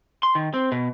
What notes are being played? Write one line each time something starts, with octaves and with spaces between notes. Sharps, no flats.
C6
D#3
C4
B2